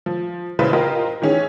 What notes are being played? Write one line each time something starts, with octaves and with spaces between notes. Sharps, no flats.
F3
A1 C#3 E3 B4 C5
F4 G4 A#4 C5 D#5
D#3 E3 C#4 G#4